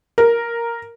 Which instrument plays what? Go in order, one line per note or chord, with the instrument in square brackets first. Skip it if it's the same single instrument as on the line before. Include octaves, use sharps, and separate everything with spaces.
[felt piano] A#4